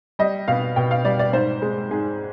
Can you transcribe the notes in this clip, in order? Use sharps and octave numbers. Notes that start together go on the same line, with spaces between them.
G3 D#5
B2 F5
B2 G5
F5
G3 D5
D5
G#2 C5
G#3
G#2 G#4